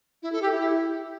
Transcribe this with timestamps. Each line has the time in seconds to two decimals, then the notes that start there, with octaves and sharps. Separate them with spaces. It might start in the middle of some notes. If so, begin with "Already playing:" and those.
0.22 E4
0.32 A4
0.42 G4
0.52 E4